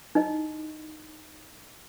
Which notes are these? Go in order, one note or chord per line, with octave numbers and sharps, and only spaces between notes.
D#4 E4 D#5